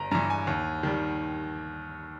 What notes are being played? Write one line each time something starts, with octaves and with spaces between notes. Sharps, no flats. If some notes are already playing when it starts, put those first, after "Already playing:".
Already playing: G1 A#5
G2 E3 A#5
G#5
D#2
D#3 G3